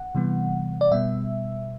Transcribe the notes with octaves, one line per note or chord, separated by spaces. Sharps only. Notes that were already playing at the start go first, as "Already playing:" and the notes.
Already playing: F#5
C3 E3 G3 B3
D5
B2 G3 B3 E5